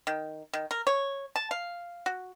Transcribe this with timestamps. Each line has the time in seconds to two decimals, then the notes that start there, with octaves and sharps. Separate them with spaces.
0.07 D#3
0.53 D#3
0.71 A#4
0.87 C#5
1.36 A5
1.51 F5
2.06 F#4